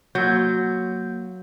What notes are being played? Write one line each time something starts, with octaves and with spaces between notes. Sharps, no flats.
F#3 A#3 G6